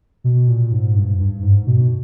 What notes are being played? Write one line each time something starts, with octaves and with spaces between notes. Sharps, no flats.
B2
A#2
G#2
G2
G2
G#2
B2